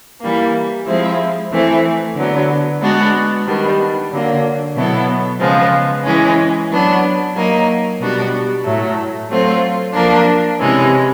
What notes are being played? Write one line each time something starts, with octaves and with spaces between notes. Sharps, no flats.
E3 G3 A#3
F3 G#3 C4 E4
E3 A3 C4 E4
D3 F#3 B3
G#3 B3 D4 F#4
D#3 G3 B3 D4
D3 F#3 A#3
B2 F#3 B3 E4 A4
C#3 F3 G#3 B3
E3 G#3 C#4
F#3 B3 D4
F#3 A#3 D#4
B2 G3 B3 D4 F#4
A2 F#3 A3
F#3 A3 C4 F4
F3 A#3 D4
C3 E3 G#3 C#4